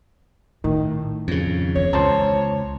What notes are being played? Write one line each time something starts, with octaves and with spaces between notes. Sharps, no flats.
A2 D#3
F2 C#3
E2 C#5
C#2 C5 A5 A#5